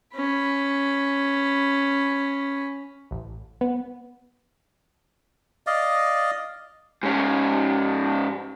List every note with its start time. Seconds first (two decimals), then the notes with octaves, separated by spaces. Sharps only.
0.15 C#4 B5
3.11 A1
3.61 B3
5.67 D5 D#5 F5
7.03 G#2 C#4